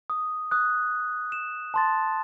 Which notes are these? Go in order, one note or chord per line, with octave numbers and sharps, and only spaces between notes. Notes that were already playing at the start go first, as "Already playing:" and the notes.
D#6
D#6 F#6
E7
A5 C6 A6